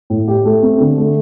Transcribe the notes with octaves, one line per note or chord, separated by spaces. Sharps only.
A2
G4
A3
C4
D3
A3